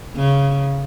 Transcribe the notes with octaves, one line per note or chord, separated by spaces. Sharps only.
C#3